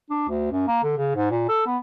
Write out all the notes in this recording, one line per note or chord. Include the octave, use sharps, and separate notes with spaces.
D4
D2
F#2
A#3
D3
C#3
G#2
A#2
A4
B3